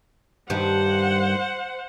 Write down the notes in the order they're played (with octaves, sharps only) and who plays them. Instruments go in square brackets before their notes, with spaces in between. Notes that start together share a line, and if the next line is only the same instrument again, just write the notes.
[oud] G2 D#3 [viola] C5 F#5